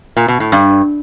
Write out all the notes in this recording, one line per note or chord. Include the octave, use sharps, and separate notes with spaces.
A#2
B2
A2
G2